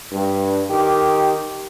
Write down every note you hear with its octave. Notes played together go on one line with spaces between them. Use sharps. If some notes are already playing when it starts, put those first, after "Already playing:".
G2
D#3 G4